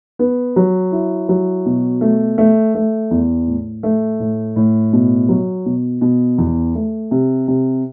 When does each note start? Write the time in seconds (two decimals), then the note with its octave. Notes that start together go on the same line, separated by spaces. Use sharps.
0.19 B3
0.56 F#3
0.92 E4
1.29 F#3
1.66 B2
2.01 A3
2.38 A3
2.75 A3
3.11 E2
3.47 A2
3.83 A3
4.20 A2
4.56 A2
4.93 B2
5.29 F#3
5.66 B2
6.01 B2
6.38 E2
6.75 A3
7.11 C3
7.48 C3